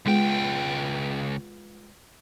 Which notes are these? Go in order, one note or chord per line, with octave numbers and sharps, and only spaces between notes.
C#2 G#3 B3 F4 G5